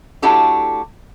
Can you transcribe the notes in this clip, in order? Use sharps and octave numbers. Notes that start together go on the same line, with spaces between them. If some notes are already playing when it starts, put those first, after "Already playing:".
A3 D4 E4 F#4 G4 A4